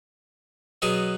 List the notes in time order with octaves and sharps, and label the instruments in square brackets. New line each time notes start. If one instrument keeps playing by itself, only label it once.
[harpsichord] B2 F#3 B3 G#4